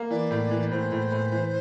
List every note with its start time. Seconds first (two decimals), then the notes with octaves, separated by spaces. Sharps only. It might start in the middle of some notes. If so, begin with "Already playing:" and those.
Already playing: A#3
0.10 E3 D5
0.31 A2
0.51 E3
0.71 A2 C5
0.92 A2
1.12 A2
1.32 E3